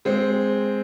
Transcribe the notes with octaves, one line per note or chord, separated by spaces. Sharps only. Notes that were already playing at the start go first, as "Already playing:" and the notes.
G#3 C4